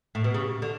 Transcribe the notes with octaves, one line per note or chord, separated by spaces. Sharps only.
A2
B2
C#3
D3